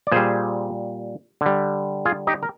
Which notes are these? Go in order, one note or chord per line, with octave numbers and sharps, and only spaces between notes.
D5
A#2 G3 G#4 C5
D3 G3
F4 G#4
D#4 G4
A#4